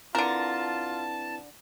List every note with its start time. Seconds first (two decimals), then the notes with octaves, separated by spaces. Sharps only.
0.15 D3 C4 E4 F4 A#4 B4 A5